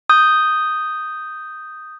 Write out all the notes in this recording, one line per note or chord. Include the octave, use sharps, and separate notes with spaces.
D#6 G6